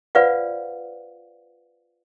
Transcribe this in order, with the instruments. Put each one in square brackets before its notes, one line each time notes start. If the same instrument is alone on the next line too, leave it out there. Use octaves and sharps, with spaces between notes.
[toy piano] F4 B4 C5 D5 F5 F#5